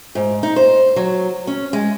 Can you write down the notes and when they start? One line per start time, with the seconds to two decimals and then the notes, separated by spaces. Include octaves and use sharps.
0.15 G#2
0.43 D#4
0.56 C5
0.96 F#3
1.47 C#4
1.73 G#3